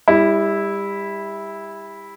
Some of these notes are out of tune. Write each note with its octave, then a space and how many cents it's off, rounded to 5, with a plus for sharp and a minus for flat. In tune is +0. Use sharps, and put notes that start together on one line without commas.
G3 +30 E4 -10